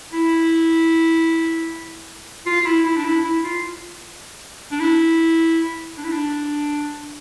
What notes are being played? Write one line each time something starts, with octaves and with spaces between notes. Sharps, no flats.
E4
F4
F4
E4
E4
D4
E4
E4
F4
D4
E4
D4
E4
D4